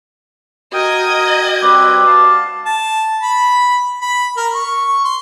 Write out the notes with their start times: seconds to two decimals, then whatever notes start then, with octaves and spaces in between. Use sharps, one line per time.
0.73 F#4 A#4 D#5 G5 D#6 G#6
1.62 G3 C4 B4 D6
2.07 F5 A5
2.66 A5
3.21 B5
4.01 B5
4.37 A#4
4.54 C#6
5.05 C6